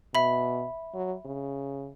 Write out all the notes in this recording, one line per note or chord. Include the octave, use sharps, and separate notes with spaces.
B2 E5 B5
F#3
C#3